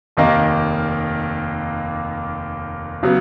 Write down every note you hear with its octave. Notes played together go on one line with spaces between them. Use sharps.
F1 D#2 D#3 A#3 D#4
C#3 F#3 B3